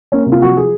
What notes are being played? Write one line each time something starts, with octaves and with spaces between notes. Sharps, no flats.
A#3 C#4
C3
F4
F3 F#4
G#4